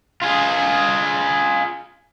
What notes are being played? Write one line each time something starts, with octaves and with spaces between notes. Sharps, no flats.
F4 G#4